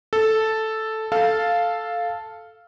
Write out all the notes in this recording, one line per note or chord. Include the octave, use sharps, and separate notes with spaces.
A4
A4 F5 A5